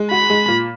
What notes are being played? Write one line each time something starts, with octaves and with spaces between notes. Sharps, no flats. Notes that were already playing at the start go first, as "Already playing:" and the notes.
Already playing: G#3
F#4 B5
G#3
A#2